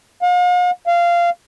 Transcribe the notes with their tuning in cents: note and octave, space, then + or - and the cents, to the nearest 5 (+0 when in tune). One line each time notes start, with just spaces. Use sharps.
F5 +45
F5 -15